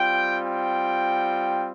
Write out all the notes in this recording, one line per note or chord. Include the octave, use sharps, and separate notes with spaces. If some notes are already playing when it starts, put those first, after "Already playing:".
Already playing: G3 C4 F4 G5
G5